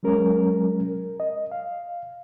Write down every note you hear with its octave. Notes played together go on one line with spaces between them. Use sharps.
F#3 G#3 C#4 A#4
D#5
F5